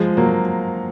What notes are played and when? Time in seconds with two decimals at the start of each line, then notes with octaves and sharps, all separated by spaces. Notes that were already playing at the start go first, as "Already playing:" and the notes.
Already playing: F3 G#3
0.17 F#3 A#3